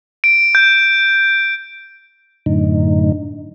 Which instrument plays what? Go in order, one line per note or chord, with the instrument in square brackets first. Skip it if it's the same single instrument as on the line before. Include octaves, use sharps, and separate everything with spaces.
[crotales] D7
G6
[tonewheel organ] F#2 A2 D3 D#4